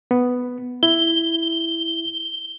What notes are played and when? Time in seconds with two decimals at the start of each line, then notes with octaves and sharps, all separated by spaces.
0.11 B3
0.83 E4 G7